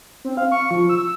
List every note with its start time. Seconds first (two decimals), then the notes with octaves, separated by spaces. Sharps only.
0.25 C4
0.37 F5
0.52 C#6
0.71 F3
0.89 E6